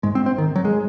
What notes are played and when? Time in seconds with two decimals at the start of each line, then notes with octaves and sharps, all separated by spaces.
0.03 G#2 G#3
0.15 C4
0.26 C4
0.38 D#3
0.56 F#3
0.65 G#3